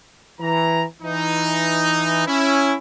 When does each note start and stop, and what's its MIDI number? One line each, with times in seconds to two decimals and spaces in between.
0.40 0.84 52
0.40 0.84 82
1.02 2.24 52
1.02 2.24 63
2.27 2.75 61
2.27 2.75 64